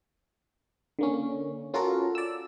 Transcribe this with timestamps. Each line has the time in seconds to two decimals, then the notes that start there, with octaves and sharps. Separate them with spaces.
0.99 D3 A#3 C#4
1.74 C#4 F4 F#4 A4 A#4
2.15 D5 E6